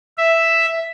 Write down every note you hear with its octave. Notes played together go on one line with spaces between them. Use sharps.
E5